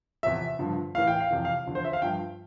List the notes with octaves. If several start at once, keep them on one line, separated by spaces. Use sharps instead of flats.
E2 C3 F3 E5
G2 D3 F3
A2 E3 F5
G5
F5
F2 C3 E3 G5
F5
E2 D3 F3
C5
E5
F5
G2 F3 G5